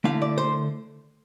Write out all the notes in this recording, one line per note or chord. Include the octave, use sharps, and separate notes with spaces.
D3 A3 E4 F5
D5
C5